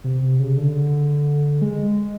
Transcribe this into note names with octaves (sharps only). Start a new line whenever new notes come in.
C3
C3
C#3
D3
G#3